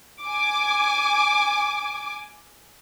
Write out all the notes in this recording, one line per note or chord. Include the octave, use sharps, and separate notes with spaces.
G#5 D6